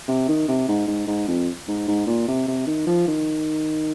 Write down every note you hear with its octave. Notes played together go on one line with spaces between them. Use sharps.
C3
D#3
C3
G#2
G#2
G#2
F2
G#2
G#2
A#2
C3
C3
D#3
F3
D#3